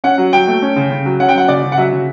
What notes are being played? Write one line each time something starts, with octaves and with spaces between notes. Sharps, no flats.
C#4 F#5
F#3
F#3 G5
A3
C#4
C#3
C#3
F#3
C#4 F#5
G5
F#3 F#5
C#3 D5
C#3
F#5
F#3 E5
C#3